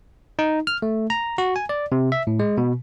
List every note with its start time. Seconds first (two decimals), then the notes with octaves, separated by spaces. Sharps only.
0.39 D#4
0.67 F6
0.82 A3
1.10 A#5
1.38 F#4
1.56 G#5
1.69 D5
1.92 C3
2.12 E5
2.27 A2
2.39 G#3
2.58 B2